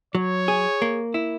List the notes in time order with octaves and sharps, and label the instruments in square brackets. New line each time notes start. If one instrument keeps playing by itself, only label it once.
[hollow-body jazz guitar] F#3 [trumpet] C#5
[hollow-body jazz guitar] G#4
A#3
E4